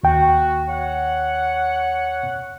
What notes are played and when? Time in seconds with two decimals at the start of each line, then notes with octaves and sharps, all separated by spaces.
0.04 D#2 F#4 G5
0.68 C#5 F#5